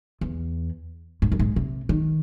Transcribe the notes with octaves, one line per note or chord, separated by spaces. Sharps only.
E2
G#2
F#2
G#2
C3
D#3